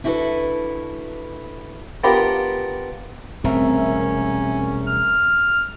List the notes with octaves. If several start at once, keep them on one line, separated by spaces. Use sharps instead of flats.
D4 E4 F#4 G4 A4 B4
B3 D4 F4 G4 A#4 B4
E1 C2 A3 C4 C#4 A#4 E5
F6